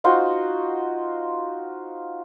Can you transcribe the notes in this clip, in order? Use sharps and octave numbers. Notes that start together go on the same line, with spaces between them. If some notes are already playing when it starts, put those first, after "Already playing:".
D#4 F4 F#4 C5